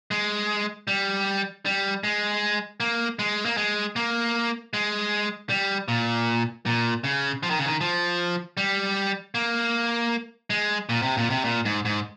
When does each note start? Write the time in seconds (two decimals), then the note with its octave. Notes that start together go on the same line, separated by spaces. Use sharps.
0.11 G#3
0.87 G3
1.66 G3
2.04 G#3
2.80 A#3
3.19 G#3
3.45 A#3
3.57 G#3
3.96 A#3
4.73 G#3
5.50 G3
5.88 A#2
6.66 A#2
7.04 C#3
7.43 F3
7.50 D#3
7.58 C#3
7.66 D#3
7.81 F3
8.57 G3
9.35 A#3
10.50 G#3
10.89 A#2
11.02 C3
11.17 A#2
11.30 C3
11.45 A#2
11.65 G#2
11.85 G#2